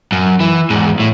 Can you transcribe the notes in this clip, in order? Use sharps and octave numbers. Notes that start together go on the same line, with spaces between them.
F#2
E3
E2 G#2
A2